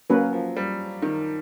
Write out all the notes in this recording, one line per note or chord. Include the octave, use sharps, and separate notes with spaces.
F#3 A#3 C#4 F#4 B4
F3
G3
D#3